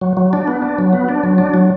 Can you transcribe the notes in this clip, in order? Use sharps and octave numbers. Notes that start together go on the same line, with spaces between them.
F#3
F#3
D4
B3
D4
F#3
B3
D4
F#3
D4
F#3